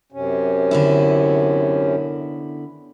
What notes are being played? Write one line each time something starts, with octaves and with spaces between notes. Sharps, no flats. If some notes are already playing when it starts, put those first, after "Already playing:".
F#2 C3 C#4
D3 B3 E4